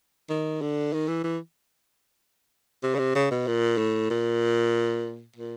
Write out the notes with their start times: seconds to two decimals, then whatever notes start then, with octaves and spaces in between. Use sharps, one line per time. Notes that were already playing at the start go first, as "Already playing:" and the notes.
0.29 D#3
0.61 D3
0.93 D#3
1.08 E3
1.24 E3
2.83 C3
2.94 C#3
2.98 C3
3.15 C#3
3.31 B2
3.47 A#2
3.77 A2
4.10 A#2
5.36 A#2